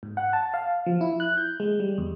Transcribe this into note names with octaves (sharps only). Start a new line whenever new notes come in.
G#2
F#5
A5
F5
F3
E4
F#6
G6
G#3
G3
E2